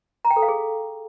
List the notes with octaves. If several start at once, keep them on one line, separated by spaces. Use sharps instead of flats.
A#5
G5
A4
F5
G#4